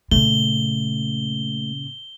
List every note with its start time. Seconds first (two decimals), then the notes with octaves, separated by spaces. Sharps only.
0.11 A#2 C#3 A3 G7